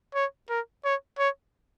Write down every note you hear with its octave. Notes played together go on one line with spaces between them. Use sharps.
C#5
A#4
C#5
C#5